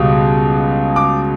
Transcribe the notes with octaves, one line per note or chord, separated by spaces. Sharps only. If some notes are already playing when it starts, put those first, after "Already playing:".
Already playing: C#2 B2 G3
D6